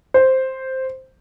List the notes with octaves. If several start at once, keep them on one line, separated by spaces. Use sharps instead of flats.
C5